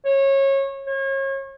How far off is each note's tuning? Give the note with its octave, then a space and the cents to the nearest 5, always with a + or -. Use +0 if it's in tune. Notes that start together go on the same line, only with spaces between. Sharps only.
C#5 -25
C#5 -35